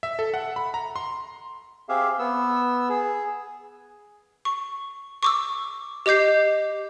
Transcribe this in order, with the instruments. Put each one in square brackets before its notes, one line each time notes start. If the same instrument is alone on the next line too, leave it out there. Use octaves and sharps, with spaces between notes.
[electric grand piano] E5
A4
F#5
B5
A#5
C6
[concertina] C4 G4 G#4 E5 F5
B3 E6
G#4
[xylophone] C#6
C#6 D6 E6
G4 D#5 D6 G6 C7